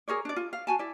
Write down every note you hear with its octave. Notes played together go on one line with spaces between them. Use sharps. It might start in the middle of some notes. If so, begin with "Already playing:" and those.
G#4 A#4 C#5 D5
D4 D5
F4
F5
F#4 G#5 A5
E4 D5